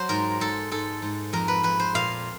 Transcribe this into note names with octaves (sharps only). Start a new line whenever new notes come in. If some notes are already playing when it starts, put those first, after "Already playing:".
Already playing: F#3 C5
G#2 A#4
G#2 A4
G#2 A4
G#2
F2 A#4
B4
F2 B4
C5
A#2 F5